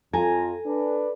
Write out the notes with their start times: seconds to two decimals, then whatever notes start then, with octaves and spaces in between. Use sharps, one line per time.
0.14 F2 F4 A4 G#5 A#5
0.65 D4 B4